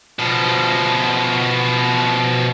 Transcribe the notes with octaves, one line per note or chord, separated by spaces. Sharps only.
B2 F3